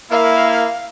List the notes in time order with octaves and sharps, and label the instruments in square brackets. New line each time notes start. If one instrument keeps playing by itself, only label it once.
[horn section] A#3 E4 [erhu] F5